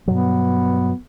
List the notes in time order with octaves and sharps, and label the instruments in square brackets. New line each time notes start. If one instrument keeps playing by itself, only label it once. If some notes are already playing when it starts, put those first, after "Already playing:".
[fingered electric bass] G2 B2 F#3 [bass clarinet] B3